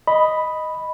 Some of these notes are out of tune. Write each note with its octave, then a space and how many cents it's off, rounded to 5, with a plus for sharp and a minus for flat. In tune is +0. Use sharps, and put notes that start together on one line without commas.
D#5 +0 B5 +0